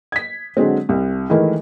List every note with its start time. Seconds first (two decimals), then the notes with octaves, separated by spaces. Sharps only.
0.12 G#6 B6
0.57 D3 F#3 G#3 C4
0.89 C2
1.30 D#3 E3 G#3 A3 E4 A#4